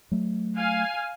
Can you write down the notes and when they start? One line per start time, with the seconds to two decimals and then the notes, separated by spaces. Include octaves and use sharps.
0.11 F#3 A3
0.56 F5 G#5